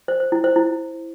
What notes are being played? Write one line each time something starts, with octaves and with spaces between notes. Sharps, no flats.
C5
C5
E4
C5
E4